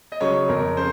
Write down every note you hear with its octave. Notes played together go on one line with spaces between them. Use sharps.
D#5
C#3 F#3 C#5
F2 A#4
C#3 C5